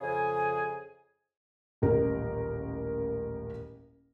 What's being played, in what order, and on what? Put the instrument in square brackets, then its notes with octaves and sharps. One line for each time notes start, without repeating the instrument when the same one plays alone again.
[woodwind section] F2 C#3 G#4 G#5
[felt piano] D#1 A1 A#4